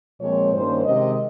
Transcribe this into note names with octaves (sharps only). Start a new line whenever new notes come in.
A#2 F3 G#3 C4 C#5
G2 D#3 A#3 C#4 C5
C3 D#3 G#3 C4 D#5